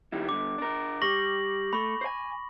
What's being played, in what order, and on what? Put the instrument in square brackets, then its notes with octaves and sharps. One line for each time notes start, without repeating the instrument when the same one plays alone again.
[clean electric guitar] D#3 G3 E4
[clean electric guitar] G2 D3 [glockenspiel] D6
[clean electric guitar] D4 A#4
[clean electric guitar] G3 [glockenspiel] C#6 A#6 F#7
[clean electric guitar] A3 [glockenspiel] B5 C#6
[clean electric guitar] C5 G#5